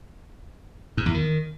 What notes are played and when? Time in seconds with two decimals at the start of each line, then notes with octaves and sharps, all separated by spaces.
0.97 G#2
1.06 E2
1.14 D#3